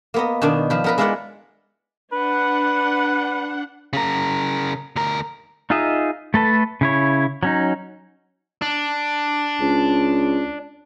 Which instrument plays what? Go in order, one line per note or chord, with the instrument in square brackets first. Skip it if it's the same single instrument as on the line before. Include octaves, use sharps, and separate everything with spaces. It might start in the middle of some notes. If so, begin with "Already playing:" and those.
[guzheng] A#3 B3 D#5
B2 D#3 D4
F3 B4
B3 A#4 B4
G#3 E4 F4 B4 D5 F#5
[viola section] D4 F#5 [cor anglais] B4
[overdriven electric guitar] C#3 A#4
D2 A#4
[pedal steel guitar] D#4 F4 G#4 D#5 E5
A3 A4 B4 A5
C#3 E4 C#5
F#3 C#4 D#4
[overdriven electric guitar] D4
[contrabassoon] C#2